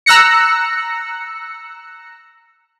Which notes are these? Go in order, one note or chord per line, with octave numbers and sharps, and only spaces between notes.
A#5 E6 F#6 A#6 C#7